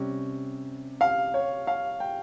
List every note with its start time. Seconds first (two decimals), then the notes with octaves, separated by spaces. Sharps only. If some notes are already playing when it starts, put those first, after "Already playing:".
Already playing: C3 G3 C#4
1.01 F5
1.34 C#5
1.67 F5
2.00 G5